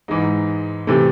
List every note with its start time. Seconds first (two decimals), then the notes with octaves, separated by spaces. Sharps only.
0.08 G#2 E3 G#3 D#4
0.87 C3 E3 A3